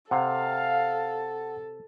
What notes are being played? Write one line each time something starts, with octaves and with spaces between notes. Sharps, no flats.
C3 A4 F5 F#5